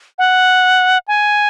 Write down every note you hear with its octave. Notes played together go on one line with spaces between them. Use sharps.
F#5
G#5